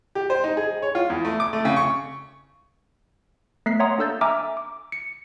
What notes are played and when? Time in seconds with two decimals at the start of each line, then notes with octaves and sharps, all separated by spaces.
0.15 G4
0.30 C5
0.44 D#4
0.57 G#4
0.82 C#5
0.95 F4
1.10 E2
1.25 A3
1.40 D6
1.53 A3
1.65 C#3
1.76 C#6
3.66 A3 B3 F#6 B6 C7
3.80 C#5 E5 F#5 A#5 C6 D#6
3.98 A#3 D4 A4 E6 G6 A6
4.21 E5 G#5 A#5 D6 E6 F6
4.57 D6
4.92 C#7